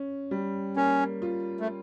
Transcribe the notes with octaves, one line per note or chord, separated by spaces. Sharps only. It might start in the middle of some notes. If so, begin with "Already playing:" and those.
Already playing: C#4
G3
A#3 C#4
F4
A3